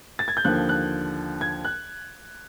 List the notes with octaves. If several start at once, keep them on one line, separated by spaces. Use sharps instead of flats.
A6
G#6
G6
D#2 D3 F3 F#6
F#6
G#6
F#6